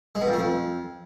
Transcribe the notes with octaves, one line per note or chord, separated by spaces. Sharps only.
G#3
B2
F2
A3
F2